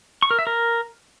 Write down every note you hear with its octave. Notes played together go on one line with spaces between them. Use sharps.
C#6
A#4
E5
A#4